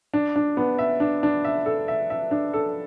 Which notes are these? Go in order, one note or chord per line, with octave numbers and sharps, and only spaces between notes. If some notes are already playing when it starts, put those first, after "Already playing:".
D4
D4
B3
E5
D4
D4
E5
A4
E5
E5
D4
A4